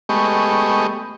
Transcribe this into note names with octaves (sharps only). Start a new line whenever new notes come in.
G#3 A3 B3 G4 D#5 C#6